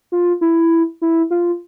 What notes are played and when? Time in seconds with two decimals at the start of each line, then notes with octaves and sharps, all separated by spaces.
0.12 F4
0.41 E4
1.02 E4
1.31 F4